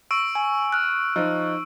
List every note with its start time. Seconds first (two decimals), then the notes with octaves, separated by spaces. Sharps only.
0.11 C#6 E6 D7
0.35 G#5
0.72 F6 F#6
1.16 F3 D#4